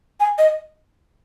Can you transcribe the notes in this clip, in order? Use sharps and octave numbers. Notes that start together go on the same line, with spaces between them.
G#5
D#5